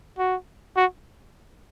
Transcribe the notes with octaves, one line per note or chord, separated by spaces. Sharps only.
F#4
F#4